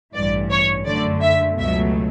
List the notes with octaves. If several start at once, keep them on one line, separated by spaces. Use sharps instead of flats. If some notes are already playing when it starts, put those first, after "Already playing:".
A1 G2 E3 D5
C#5
F#2 D3 A3 D5
E5
C#2 B2 F#3 A3 E5